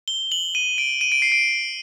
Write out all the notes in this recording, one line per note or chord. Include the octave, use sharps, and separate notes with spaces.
G7
F#7
D#7
D7
D#7
D7
C7
D7